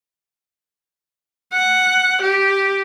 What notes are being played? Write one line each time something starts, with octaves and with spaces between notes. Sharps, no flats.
F#5
G4